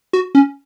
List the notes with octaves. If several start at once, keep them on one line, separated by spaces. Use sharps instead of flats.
F#4
C#4